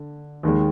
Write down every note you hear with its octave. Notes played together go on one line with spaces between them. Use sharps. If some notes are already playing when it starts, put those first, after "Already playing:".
Already playing: D3
D#2 D#3 G#3